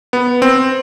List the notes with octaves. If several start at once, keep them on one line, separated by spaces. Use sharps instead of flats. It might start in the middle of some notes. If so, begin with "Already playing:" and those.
B3
C4